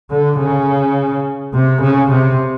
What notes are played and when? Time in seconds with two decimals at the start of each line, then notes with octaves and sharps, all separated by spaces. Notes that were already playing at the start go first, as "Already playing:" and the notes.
0.11 D3
0.39 C#3
1.54 C3
1.81 C#3
2.10 C3